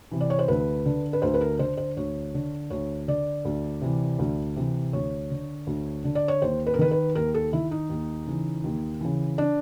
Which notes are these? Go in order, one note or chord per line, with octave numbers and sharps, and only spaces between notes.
C3 E3
D5
C#5
C5
D2 B4
D3
B4
D2 C5
B4
A#4
D3 C5
C5
D2 C#5
D3
D2 C#5
D3 D5
D2
C3 E3
D2
C3 E3
D2 C#5
D3
D2
D3
D5
C#5
D#2 C5
B4
A#4
D#3 B4
B4
D#2 A#4
A4
D#3 E4
D#4
D#2
C#3 E3
D#2
C#3 E3
D4